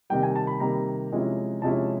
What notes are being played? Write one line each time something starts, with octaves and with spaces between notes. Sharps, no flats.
C3 D#3 G3 A#3 G5
G#5
A5
B5
C3 D#3 G3 A#3 A#5
C3 F3 G#3 C#4 E4
C3 F3 G#3 C#4 E4 A5